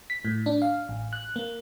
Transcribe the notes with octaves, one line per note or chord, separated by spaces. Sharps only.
B6
A2
D4
F5
A1
F#6
A#3